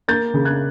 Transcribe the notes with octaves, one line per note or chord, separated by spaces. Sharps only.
A#3 G6 A6
C#3
F#6 G#6